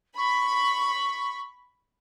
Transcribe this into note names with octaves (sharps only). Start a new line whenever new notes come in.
B5 C#6